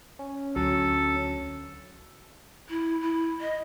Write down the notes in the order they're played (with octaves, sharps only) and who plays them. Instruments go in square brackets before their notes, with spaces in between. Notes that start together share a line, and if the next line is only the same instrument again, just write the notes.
[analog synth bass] C#4
[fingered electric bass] D2 [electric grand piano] F#3 [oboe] A4
[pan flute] E4
E4
D#5